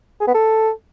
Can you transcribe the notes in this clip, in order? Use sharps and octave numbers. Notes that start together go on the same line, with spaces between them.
G#4
B3
A4